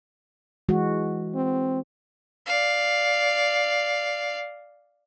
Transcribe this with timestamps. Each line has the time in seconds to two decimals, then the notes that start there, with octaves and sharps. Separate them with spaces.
0.69 E3 G#3 F#4
1.35 C4
2.46 D5 F5